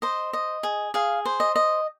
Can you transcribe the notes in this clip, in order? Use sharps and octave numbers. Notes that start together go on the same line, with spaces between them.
C5 D#5
D#5
G#4
G#4 F5
C5
D#5
D#5